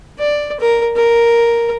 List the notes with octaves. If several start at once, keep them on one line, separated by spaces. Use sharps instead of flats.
D5
A#4
A#4